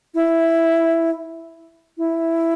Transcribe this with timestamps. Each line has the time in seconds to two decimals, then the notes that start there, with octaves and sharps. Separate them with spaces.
0.15 E4
1.98 E4